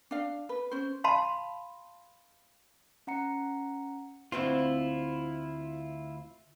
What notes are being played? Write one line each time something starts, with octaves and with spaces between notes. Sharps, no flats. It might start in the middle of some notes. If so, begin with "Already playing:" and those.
D4 F5
B4
C#4 C5
F5 A5 B5 C6
C#4 F#5 A#5 C#7
D2 C4 E4 F4 C5